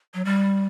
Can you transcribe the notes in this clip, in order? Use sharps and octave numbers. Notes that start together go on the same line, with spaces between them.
F#3
G3